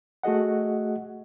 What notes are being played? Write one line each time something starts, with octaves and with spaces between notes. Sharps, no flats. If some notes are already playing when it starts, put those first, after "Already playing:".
A3 F#4 G#4 D#5 F#5